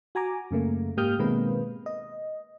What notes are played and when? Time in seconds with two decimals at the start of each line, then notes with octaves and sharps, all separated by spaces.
0.15 F#4 G#5 A#5 D6
0.51 F#2 C#3 A3 A#3
0.97 G#2 A#3 G4 D#6 F6 G6
1.19 B2 D#3 G#3 A#3 C4 B4
1.86 D#5